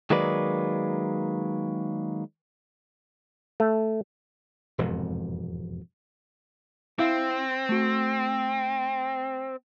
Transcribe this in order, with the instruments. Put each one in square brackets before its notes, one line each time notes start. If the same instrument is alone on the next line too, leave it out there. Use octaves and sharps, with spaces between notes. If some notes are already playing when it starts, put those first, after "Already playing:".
[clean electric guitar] D#3 F#3 G#3 A#3 B4 D5
[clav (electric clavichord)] A3
[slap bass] E1 F2 G#2 C3
[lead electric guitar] C4 [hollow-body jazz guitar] E4 F5
[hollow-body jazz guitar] A3 F#4